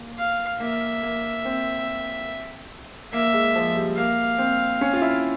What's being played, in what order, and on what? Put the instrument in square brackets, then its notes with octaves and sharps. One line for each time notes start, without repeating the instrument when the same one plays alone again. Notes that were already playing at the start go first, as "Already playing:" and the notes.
Already playing: [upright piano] A#3
[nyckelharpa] F5
[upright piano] A#3 [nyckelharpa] E5
[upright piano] A#3
C4
[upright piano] A#3 [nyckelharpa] E5
[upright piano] G#3
F3
G3
[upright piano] A#3 [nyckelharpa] F5
[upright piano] C4
C#4
F4
E4